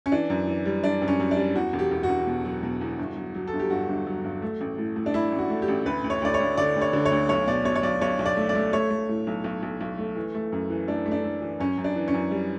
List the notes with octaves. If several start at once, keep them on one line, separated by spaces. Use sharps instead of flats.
C#4
E3 D4
F#2
E3
G3
G3 D4
F#2
C#4
F#2
D4
G3
E2 F#4
E1
G4
E1
F#4
E1
B2
F#3
B2
E2
G1
F#3
F#3
A4
G1
G4
G2 F#4
G1
F#3
G2
A3
A1
A2
A2
D4
A2 E4
A1
F#4
A3
G4
A1
D2 B4
D2
C#5
D2 D5
C#5
D2
D3 D5
D2
C#5
D3
C#5
D2
B1 C#5
B2 D5
B2 C#5
C#5
B1 D5
B1 C#5
B1
D5
A3
D5
A3
A3 C#5
A3
A2
B1
B1
B1
B1
A3
E3
A3
F#2
E3
A3 D4
A3
D4
A3
E3
F#2 C#4
F#2
D4
E3
C#4
F#2
G3